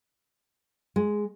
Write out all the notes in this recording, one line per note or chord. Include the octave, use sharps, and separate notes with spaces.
G#3